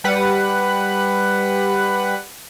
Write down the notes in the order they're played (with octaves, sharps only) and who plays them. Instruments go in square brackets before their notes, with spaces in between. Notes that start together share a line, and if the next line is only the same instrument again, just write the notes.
[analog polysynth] G3 B4 F#5